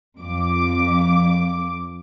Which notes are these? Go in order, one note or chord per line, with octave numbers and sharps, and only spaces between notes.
F2 D6